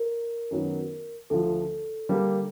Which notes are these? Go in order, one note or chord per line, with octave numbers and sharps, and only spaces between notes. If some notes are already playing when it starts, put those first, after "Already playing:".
Already playing: A#4
F#2 D#3 F#3 B3
D2 D3 F3 A4
D3 G3 A#3